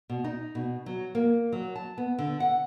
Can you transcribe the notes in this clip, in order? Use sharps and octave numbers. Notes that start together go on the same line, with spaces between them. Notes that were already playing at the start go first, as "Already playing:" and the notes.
B2
D#4
B2
F#3
A#3
F#3
A5
B3
D3
F#5